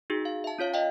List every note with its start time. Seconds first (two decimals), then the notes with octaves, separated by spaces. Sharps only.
0.10 D#4 F#4 G#4
0.25 F5
0.44 E5 A5
0.59 C#4 F4 C#5 F5
0.74 D#5 F5 G5